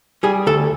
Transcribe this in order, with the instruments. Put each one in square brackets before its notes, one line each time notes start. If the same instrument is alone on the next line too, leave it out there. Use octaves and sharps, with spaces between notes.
[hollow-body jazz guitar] G3 G#4
D2 A4